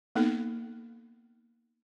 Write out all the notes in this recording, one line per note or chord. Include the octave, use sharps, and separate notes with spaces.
A#3 B3 D#4 A4